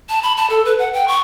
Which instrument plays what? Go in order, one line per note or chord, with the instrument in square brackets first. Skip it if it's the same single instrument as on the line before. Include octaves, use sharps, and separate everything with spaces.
[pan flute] A5
B5
A5
A4
B4
F#5
G5
C#6